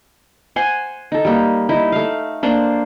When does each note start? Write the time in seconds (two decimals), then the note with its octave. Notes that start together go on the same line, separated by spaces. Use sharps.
0.56 C5 F#5 G#5 C6
1.12 D#4 A4
1.25 G3 A#3
1.69 D#4 E4
1.92 A3 F5
2.43 A#3 D4 C5 D5